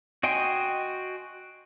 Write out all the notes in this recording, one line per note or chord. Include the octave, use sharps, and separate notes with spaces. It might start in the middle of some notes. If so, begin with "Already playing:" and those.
F#4 D#5 G5 G#5 C6